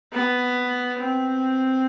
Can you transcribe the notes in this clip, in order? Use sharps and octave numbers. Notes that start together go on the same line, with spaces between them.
B3
C4